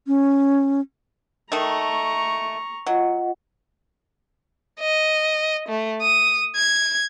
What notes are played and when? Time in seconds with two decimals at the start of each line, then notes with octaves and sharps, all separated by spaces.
0.07 C#4
1.52 D#3 A3 A#5 C#6
2.86 F#3 F4 D#5 F#5
4.80 D#5
5.69 A3
6.02 D#6
6.56 G#6